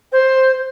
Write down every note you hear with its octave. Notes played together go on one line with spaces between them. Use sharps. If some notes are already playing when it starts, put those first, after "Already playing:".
C5